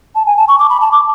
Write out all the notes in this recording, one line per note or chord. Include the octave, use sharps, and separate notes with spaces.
A5
G#5
A5
C#6
D6
B5
A5
D6